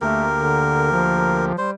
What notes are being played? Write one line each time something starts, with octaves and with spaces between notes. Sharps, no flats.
D2 A3 A#3 G4 A#4
D3
F3
G3 C5